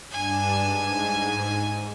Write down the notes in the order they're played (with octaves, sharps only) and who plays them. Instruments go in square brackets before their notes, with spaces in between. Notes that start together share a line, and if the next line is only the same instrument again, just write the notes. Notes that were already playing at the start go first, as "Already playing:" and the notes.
[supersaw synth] G2 D4 E7 [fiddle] G#5
[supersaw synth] G#2